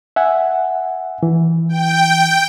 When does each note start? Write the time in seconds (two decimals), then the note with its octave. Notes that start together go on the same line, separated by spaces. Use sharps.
0.16 E5 F#5 G#5
1.23 E3
1.69 G5